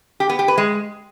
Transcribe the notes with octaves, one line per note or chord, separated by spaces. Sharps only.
G4
B3
G4
B4
G#3